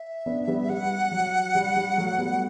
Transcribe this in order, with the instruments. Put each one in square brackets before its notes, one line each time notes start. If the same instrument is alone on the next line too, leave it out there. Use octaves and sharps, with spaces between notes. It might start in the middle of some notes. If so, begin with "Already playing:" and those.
Already playing: [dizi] E5
[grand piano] B3 D4
G3 B3
[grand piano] G3 [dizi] F#5
[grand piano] F#3
G3
G3
F#3 A3
G3 B3